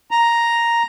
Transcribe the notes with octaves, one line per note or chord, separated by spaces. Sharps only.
A#5